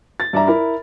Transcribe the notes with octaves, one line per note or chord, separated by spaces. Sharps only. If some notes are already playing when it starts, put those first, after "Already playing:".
A6
G2 D5 E5 A#5
E4 A#4 B5